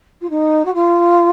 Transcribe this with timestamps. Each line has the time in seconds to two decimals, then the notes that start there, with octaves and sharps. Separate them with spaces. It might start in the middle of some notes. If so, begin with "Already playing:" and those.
0.21 F4
0.29 D#4
0.65 F#4
0.74 F4